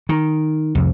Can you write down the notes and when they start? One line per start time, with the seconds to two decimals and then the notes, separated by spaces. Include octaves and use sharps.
0.09 D#3
0.75 C2 F2